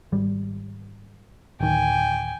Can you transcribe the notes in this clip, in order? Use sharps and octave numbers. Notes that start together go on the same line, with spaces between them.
G#1 G3
D1 D#3 G5 G#5